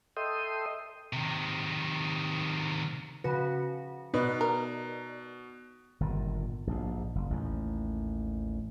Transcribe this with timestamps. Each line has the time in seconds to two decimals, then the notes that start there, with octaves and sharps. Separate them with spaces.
0.17 A4 D#5 E5 G5 C6 D#6
1.13 C3 D#3
3.24 C#3 F3 F#4 B4
4.14 B2 D#4 B4 D5
4.41 A#4
6.00 G1 A#2 D#3
6.67 A#1 G#2
7.15 F#1
7.30 A1 D#2